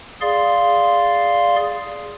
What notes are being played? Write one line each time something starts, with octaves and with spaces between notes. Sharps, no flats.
G#4 D5 F5 C6